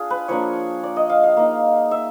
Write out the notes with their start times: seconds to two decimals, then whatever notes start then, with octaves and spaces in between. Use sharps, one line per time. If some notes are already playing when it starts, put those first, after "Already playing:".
Already playing: D4 F4 G#4
0.10 B4
0.28 F3 A#3 D4 C#5
0.83 D5
0.96 D#5
1.09 F5
1.24 F5
1.37 A#3 D#4
1.91 E5